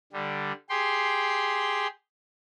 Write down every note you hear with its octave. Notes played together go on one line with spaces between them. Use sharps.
D3 G3
G4 G#4 G5 C6